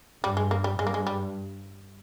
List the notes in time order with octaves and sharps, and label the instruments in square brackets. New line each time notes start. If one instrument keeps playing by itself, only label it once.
[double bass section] G2 [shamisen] G3
[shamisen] G#3
A#3
G3
[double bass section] G2 [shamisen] G#3
[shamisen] A#3
G#3
G3